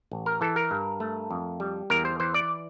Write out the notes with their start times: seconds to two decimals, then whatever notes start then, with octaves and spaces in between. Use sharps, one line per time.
0.12 A1
0.26 A#4
0.41 E3 A4
0.56 A#4
0.71 G2
1.00 A3
1.31 F2
1.60 G3
1.90 E2 A#4
2.05 C5
2.20 E3 C5
2.34 D5